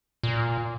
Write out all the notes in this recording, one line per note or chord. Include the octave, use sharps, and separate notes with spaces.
A#2